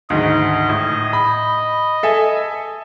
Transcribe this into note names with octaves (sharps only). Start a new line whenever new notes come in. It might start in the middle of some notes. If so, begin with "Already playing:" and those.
D2 G#2 D#3 D#5
A2
B5
A4 E5 G#5